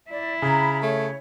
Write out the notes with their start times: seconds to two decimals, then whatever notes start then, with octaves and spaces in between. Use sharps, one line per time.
0.11 E4 D5
0.42 C#3 A#5 B5
0.83 A3 C#5